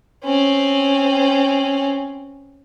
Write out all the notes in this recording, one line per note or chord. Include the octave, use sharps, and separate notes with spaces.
C4 C#4